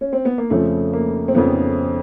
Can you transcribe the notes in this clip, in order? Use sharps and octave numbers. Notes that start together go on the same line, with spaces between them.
C#4
C4
B3
A#3
F2 C#3 F3 A3
A#3
C4
F2 C#3 F3 B3